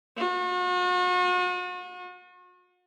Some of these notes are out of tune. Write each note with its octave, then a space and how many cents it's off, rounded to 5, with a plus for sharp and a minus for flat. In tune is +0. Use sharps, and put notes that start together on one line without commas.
F#4 -40